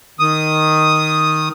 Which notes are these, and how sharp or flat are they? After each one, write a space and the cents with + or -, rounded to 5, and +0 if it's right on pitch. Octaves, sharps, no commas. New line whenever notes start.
D#3 +0 D#6 +0